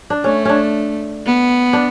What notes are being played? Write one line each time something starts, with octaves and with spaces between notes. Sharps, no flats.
D4
A3 C#4
C#4 D4
B3
D4